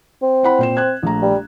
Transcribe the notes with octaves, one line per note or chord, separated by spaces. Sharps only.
C4
E4 F#5 B5
A#2 C5 E7
F#6 G#6
A#1 A3 A#5
G3